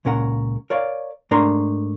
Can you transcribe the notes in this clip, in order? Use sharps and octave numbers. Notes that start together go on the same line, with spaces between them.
C#2 A#2 C#4 A#4 F#5
A#4 C#5 D5 F5
G#2 A3 D4 A#4 A#5 C6